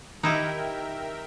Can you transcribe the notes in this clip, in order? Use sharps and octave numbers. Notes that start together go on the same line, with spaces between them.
D#3 D#4 E4 G4 A#4 E5 G5